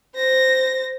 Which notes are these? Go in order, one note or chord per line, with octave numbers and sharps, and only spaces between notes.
C5 A#6